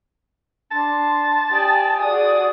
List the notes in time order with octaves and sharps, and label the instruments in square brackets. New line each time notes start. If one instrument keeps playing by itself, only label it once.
[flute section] D4 C6 [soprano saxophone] A5
[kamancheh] G4 D5 [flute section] G#5 D#6
[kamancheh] F#4 D#6 [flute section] G#4 D5